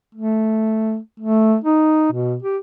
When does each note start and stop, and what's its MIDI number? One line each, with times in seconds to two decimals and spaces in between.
0.15 0.97 57
1.20 1.56 57
1.64 2.08 63
2.12 2.36 47
2.43 2.58 67